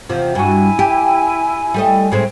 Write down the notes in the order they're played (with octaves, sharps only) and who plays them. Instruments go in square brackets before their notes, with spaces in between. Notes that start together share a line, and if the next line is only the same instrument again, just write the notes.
[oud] E2 C3 F3
[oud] G2 F#4 [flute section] E4 G#5
[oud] G4
G3 A3 D#5
A2 G#3 C4